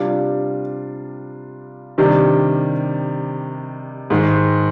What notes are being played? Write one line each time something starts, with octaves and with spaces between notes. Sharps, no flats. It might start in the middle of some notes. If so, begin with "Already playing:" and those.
Already playing: C3 G3 D4 F4
C3 D#3 G3 D4
G#2 D#3 G#3